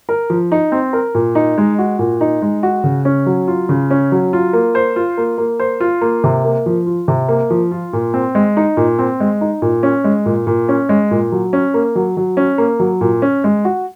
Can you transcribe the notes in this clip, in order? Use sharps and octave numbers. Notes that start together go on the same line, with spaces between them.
A#4
F3
D#4
C4
A#4
A#2
D#4
G#3
F#4
A#2
D#4
G#3
F#4
C#3
C#4
F#3
F4
C#3
C#4
F#3
F4
A#3
C5
F4
A#3
A#3
C5
F4
A#3
C3
A#3
F3
F4
C3
A#3
F3
F4
A#2
C4
G#3
D#4
A#2
C4
G#3
D#4
A#2
C#4
G#3
A#2
A#2
C#4
G#3
A#2
F#3
C#4
A#3
F#3
F#3
C#4
A#3
F#3
A#2
C#4
G#3
F#4